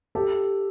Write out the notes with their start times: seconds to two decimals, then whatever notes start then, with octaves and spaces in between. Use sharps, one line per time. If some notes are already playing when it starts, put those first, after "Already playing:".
0.15 G4 A4